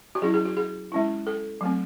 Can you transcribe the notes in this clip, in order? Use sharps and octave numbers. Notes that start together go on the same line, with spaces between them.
F#4
F#3 C#4 E4 G#4
G#4
F#4
G#4
G#3 C#4 E4
A4
F#3 A3 C4